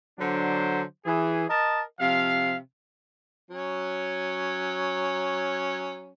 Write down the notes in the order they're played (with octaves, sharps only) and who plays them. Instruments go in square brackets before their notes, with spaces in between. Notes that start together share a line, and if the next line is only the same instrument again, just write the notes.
[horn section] D3 F#3 D4 C5
E3 G#4
A#4 D#5 A5
C3 F3 F5
[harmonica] F#3 C#4